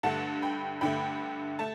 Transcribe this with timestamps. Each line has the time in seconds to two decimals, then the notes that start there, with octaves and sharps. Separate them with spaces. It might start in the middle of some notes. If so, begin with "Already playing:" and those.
0.03 G2 D3 A3 F#5 A5
0.42 G5 B5
0.81 G2 D3 A3 G5 B5
1.59 A3 A5